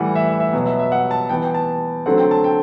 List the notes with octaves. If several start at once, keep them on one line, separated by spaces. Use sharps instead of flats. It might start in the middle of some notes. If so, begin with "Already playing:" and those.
Already playing: A2 E3 G3 F#5
E5
E5
E5
B2 F#3 B3
E5
E5
F#5
A5
E3 B3 G5
G5
A5
D3 F#3 A3 C4 F#5
G5
A5
G5